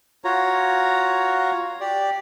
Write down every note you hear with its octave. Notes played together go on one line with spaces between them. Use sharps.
F4 F#4 C#5 A#5
G4 D5